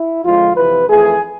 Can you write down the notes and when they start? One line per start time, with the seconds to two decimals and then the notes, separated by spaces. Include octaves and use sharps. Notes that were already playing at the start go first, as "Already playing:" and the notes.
Already playing: E4
0.24 F2 D3 F3 G#3 F4
0.57 F2 C3 E3 B4
0.89 F2 E3 A3 G#4